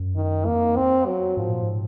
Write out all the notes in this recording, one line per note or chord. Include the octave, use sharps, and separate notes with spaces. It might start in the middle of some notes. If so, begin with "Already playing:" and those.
Already playing: F#2
D#3
F2 A#3
C4
F#3
G#2 F3
A#2
G#2